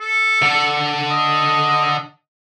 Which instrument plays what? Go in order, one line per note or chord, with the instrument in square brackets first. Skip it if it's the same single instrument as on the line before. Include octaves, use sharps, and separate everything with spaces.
[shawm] A4
[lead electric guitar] D3 D4
[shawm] D#5